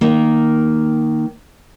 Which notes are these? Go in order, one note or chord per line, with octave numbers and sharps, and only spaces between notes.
D#3 A#3